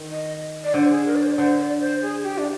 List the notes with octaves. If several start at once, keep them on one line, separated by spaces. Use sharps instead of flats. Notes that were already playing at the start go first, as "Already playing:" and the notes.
Already playing: D#3
D#5
D5
D3 C5
G#4
A#4
D5
C5
D5
D3 C5
D5
C5
G#4
G4
D4